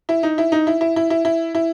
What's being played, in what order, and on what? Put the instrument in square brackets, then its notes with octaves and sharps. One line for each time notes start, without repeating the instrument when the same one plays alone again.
[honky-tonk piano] E4
D#4
E4
D#4
E4
E4
E4
E4
E4
E4